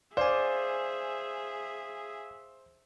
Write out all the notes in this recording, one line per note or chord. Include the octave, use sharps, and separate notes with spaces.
G#4 C5 D5 E5 F5 G#5